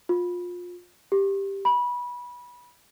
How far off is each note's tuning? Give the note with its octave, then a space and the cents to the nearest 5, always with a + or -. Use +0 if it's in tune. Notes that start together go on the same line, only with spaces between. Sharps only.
F4 +25
G4 +5
B5 -20